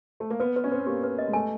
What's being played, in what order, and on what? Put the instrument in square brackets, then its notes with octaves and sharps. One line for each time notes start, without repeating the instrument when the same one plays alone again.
[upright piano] A3
A#3
[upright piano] B3 [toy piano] B4
[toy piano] B4
[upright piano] C#4
[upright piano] C4 [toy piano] B4
[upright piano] B3
[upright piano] A#3 [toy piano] G4
[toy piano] B4
D#5
[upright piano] G#3
[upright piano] A3 [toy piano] G#5